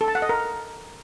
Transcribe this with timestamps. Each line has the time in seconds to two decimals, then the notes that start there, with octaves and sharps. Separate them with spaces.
0.01 A4
0.08 A5
0.15 F#5
0.22 D#5
0.29 A#4